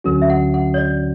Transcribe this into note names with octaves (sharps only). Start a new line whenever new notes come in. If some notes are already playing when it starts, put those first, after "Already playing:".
D2 D3 F#3 C#4 F#4 A#4
E5
F#5
F#5
C#5
D5